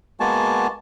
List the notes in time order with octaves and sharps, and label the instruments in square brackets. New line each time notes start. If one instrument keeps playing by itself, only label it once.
[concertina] G#3 A#3 B3 F#4 G#5 A5